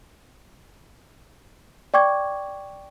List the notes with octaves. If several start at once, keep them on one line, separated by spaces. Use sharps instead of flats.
D5 G5 C#6 D6 G#6